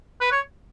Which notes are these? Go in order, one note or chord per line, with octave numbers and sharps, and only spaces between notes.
B4
C#5